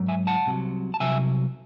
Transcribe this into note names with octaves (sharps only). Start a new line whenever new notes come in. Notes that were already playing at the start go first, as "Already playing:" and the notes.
Already playing: G#2 F#3
E5 G#5
F#5 A5
C2 C3 F#3
A5
C2 C3 F#3 E5 G#5